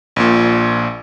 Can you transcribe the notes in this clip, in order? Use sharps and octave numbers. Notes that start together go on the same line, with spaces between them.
A#1 A#2